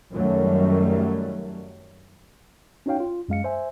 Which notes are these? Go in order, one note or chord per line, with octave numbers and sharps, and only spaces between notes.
F#2 D#3 F#3 G3 A3
C#4 D#4 F#4 C#5 F5 G5
F4
F#2 G#3 F5 C#7
C5 E5 G#5